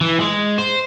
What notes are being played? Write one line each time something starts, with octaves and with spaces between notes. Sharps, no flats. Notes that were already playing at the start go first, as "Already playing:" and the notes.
E3
G#3
C5